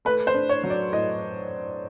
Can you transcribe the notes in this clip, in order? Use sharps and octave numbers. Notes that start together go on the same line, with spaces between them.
A3 B4
C5
D4
C#5
F#3
D5
A2 D#5